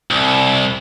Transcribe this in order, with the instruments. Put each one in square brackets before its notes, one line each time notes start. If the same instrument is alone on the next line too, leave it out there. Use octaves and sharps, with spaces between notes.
[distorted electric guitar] C2